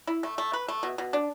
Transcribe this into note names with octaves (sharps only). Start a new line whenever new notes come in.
E4
A3
A3
B4
A3
B2
B2
D4